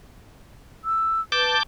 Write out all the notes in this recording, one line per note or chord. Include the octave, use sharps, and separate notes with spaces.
E6
B4 A5 D6 G6